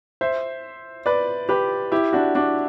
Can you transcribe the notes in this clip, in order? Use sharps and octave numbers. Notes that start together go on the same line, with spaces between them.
C5 E5
B4 D5
G4 B4
E4 G4
D4 F#4
D4 F#4